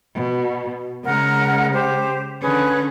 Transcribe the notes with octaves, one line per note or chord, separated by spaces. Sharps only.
B2
C#3 G#3 A#4 F#5 A#5
G4 C5
D3 C#4 G#4 B4